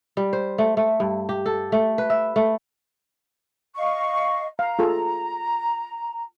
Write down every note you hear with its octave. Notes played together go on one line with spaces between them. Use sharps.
G3
C5
A3
A3
G2
G4
A4
A3
B4
E5
A3
D#5 F5 C#6
F5 A#5
F4 G#4 A4